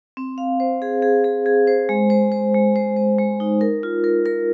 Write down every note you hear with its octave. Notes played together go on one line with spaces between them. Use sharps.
C4
F5
C5
G#4
G#4
G#4
G#4
C5
G#3
C5
C5
G#3
C5
C5
G#3
D#4
A#4
F4
A#4
A#4